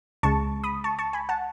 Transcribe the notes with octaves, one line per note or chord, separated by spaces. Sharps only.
C#2 C#3 G#3 A5 C#6
B5 D#6
A5 C#6
A5 C#6
G#5 B5
F#5 A5